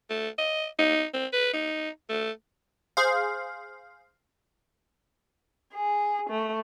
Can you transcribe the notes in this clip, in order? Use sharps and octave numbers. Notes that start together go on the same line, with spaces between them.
A3
D#5
D#4
C4
B4
D#4
A3
G#4 C5 F5
G#4
A3